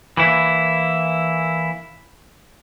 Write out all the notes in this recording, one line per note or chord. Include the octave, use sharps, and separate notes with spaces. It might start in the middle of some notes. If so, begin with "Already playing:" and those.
E3 A#3 E4